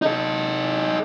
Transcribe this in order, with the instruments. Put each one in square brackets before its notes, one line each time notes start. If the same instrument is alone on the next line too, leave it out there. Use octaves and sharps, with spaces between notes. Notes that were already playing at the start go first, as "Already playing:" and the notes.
[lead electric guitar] D#4 A4